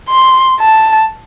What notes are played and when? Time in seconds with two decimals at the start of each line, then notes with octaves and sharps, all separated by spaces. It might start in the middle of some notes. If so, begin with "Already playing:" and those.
0.09 C6
0.61 A5